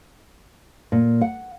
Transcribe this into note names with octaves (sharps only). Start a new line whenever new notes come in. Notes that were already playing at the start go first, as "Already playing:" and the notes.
A#2
F#5